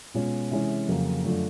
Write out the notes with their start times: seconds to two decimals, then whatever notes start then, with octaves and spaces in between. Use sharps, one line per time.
0.14 B2 G#3 C#4 F4
0.51 C3 E3 G#3 C#4
0.88 F2 C#3 F#3 A#3
1.24 F#2 D3 F3 A3 D4